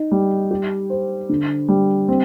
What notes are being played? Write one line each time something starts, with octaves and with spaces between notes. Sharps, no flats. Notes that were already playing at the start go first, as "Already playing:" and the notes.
Already playing: D#4
G3
G4
C5
D3
G3
C4